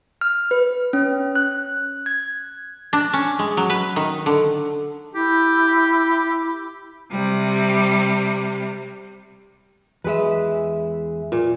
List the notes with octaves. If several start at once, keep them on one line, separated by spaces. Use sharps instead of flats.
F6
B4
C#4
F#6
G#6
D4
C#4
G#3
F#3
B4
D#3
D3
E4 G4
C3 G3
E2 G#3 G#4 B4 E5
A#2